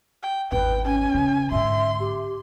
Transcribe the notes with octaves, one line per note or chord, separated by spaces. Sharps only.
G5
G#1 E2 B4 G5
C#4 G#5
C#3
G#2 D3 E5 C6
G4